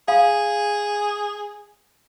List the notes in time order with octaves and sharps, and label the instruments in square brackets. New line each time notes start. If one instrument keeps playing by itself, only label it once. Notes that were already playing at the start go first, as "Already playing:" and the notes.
[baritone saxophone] G#4 [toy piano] F5